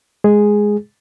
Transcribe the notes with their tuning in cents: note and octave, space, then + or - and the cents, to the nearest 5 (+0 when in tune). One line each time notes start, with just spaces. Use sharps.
G#3 +0 G#4 +0